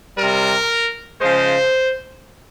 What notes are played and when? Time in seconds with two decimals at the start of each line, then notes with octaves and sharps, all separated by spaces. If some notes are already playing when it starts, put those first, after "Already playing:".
0.18 C3 G3 A#4
1.20 C#3 F3 G#3 C5